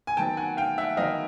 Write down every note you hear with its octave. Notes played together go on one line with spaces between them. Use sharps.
G#5
D#3 F#3 B3 G5 A5
F#5 G#5
F5 G5
E5 F#5
D#3 F#3 B3 D#5 F5